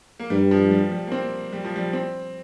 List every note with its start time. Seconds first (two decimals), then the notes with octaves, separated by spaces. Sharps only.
0.20 A#3
0.30 G2 G3
0.51 F3
0.71 G3
0.92 G3
1.07 A#3
1.12 C4
1.53 G3
1.65 F3
1.76 G3
1.93 C4